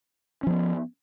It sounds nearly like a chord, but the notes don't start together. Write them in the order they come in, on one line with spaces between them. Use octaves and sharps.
C#4 F3 B3